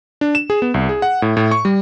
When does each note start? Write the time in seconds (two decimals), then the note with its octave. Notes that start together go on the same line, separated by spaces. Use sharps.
0.21 D4
0.35 E7
0.50 G#4
0.62 B3
0.74 C2
0.89 G#4
1.02 F#5
1.22 A2
1.37 A2
1.51 C#6
1.65 G3